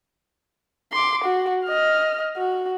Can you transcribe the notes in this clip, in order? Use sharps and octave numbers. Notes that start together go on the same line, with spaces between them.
C6 D6
F#4
D#5 F6
F#4